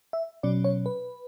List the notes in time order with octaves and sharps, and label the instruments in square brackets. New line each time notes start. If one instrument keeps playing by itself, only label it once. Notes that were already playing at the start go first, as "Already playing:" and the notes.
[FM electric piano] E5
B2 F#3 C#4 D5
C#5
B4